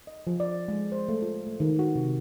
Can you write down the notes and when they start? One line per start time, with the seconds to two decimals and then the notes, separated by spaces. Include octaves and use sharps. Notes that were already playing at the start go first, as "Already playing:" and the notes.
0.07 D#5
0.27 F3
0.40 D5
0.68 G#3
0.92 C5
1.09 A3
1.22 F4
1.46 A3
1.60 D#3
1.79 F#4
1.96 C3